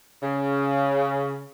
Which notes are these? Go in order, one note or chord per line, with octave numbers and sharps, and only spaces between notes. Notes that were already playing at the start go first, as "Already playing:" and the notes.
C#3